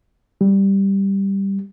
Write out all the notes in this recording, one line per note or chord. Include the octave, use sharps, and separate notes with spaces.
G3